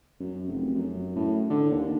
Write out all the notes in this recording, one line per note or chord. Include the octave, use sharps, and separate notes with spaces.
F#2
F1
F#2
A2
D3
D#2